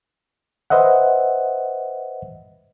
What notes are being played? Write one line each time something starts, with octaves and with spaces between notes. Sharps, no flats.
B4 C5 D#5 E5 F#5